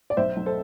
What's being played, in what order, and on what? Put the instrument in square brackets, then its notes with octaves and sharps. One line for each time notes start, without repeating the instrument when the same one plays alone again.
[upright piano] D5
B1 C5 E5
B1
A4 C5